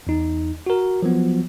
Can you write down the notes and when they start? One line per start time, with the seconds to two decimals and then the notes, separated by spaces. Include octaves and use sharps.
0.07 E2 D#4
0.66 F#4 A#4
1.02 F3 F#3 B3